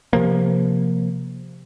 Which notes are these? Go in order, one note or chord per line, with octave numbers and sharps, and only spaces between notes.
C3 F3 A#3